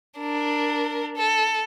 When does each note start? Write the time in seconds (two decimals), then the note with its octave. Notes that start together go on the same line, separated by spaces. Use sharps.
0.18 D4 A#4
1.16 A4